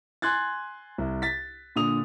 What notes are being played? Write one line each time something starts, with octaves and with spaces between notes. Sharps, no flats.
G#5 C6 F#6 G#6 A6
C2
A6 B6
A#2 D3 D#6 F7